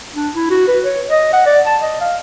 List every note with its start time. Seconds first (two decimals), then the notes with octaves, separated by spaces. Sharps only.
0.15 D4
0.35 E4
0.50 F#4
0.68 B4
0.84 C#5
1.10 D#5
1.33 F#5
1.46 D5
1.66 A5
1.82 D#5
2.01 F5